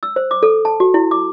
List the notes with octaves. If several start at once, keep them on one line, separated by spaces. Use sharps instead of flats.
E6
C5
D6
A4
A5
F#4
E4
D6